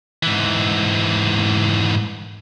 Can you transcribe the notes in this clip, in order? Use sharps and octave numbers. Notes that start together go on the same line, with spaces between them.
G#2 E3